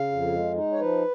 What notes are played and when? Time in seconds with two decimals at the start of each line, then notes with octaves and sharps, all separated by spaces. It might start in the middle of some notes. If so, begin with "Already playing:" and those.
Already playing: C#3 F5
0.12 F2
0.34 G#3
0.56 D#4
0.72 C#5
0.80 F3 B4